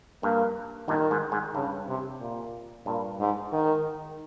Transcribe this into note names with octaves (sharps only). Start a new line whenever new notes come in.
G2 A#3
G2 A#2 D#3
G#2
G#2
G2 C#3
C3
A#2
G2 A#2
G#2
D#3